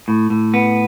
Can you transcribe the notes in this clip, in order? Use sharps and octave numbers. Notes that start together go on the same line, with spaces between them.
A2
A2
B3